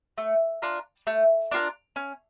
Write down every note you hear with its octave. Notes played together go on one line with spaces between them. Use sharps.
A3
D4 F4 A#4
A3
D4 F4 A#4
C#4